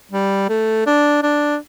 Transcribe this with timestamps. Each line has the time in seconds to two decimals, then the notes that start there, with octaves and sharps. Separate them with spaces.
0.11 G3
0.49 A3
0.86 D4
1.23 D4